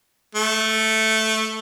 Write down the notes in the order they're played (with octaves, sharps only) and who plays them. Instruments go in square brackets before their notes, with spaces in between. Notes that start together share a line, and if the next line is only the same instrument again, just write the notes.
[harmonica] A3